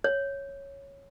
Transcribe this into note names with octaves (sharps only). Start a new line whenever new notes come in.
C#5